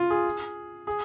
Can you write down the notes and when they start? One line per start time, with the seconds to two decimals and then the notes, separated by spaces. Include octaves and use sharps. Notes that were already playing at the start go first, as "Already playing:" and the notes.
Already playing: F4
0.10 G#4
0.87 G#4